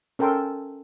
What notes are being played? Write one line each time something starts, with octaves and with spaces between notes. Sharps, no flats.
C#4 A4 A#4 G5 C6